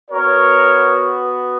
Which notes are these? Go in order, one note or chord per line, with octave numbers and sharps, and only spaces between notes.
B3 F#4 A#4 C#5